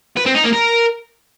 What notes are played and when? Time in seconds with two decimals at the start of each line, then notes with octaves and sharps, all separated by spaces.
0.17 B4
0.26 C4
0.35 D#4
0.44 A#3
0.53 A#4